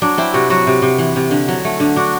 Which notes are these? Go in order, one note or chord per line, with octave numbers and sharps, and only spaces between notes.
F#3 D4
C4 E4
C3 F#4
F#3 F#4
C3
C3
E3
C3
D3
F#3
A3
D3
D4 F#4